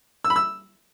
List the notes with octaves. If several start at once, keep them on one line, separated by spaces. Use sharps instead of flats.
E6
B5
E6